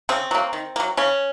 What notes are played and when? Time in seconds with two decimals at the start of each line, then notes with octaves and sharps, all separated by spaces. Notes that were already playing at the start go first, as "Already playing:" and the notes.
0.09 C#3 C4
0.31 F#3 A#3
0.53 D#3
0.76 F#3 A#3
0.97 C#3 C#4